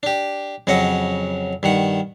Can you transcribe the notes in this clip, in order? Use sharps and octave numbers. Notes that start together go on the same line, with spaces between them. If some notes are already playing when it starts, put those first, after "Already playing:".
D4 G4
F2 C#3 F#3 D#5 F#5
G2 D#3 F#5